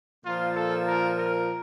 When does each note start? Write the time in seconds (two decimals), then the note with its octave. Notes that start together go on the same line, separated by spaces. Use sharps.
0.23 A#2 F3 A#3 F4
0.54 A4
0.85 A#4
1.17 A#4